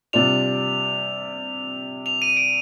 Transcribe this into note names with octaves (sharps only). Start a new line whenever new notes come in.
C3 G3 D4 F4 F7
F7
D#7
D7